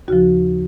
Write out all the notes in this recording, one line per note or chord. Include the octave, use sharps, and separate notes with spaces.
D#2 C#3 F3 F#4